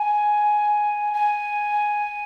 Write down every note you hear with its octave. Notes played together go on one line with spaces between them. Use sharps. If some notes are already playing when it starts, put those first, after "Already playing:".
Already playing: G#5
G#5